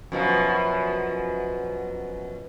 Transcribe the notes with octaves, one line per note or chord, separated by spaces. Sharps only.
F#2 B2 F3